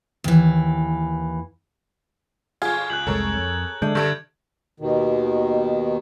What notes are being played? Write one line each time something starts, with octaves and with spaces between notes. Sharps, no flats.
D#2 E3
G1 F4 G#4 G#6
C#2 F#6 G6 F#7
F1 C2 G#3 A4 A#4 C#5
F2
D3 G#3 A3 D4 G6
G2 D3 A4 G6 G#6 D7
D#2 B2 D#3